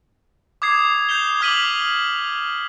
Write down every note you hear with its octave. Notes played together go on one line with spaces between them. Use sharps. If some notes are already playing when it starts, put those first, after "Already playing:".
D6 D#6 G#6 C7
G6 C7 F7 G7
D6 F6 B6 D#7 F#7 G7